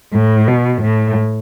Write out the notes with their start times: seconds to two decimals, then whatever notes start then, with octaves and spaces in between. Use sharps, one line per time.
0.13 A2
0.48 B2
0.82 A2